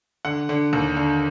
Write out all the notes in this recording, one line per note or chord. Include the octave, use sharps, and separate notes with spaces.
D3 F#5
D3
D#2
D3